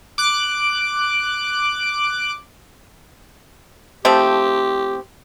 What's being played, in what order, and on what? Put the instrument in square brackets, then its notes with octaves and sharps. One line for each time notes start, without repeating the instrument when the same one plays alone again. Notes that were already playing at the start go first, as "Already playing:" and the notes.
[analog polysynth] D6 F#6 D7
[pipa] F3 A3 C4 [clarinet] G4